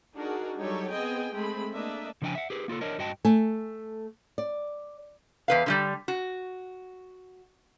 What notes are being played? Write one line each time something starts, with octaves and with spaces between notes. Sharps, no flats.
D4 D#4 F#4 G#4 A#4
F#3 G3 D#4 G4 A4 C#5
B3 C4 G#4 D#5 G5 G#5
G#3 A3 C4 G#4 B5
A3 A#3 D4 D#5 E5
C#3 F3 D4 D#5 G5 G#5
E5 F#5
G4 G#4 B4
A#3 F4 G#4 A4
D4 A#4 C#5 D#5
G2 F#4 D#5 G5 A5
A3 G#5
D5
E2 B4 F5
D3 F3 G3
F#4